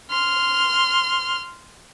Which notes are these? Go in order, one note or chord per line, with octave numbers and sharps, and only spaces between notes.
C6 F6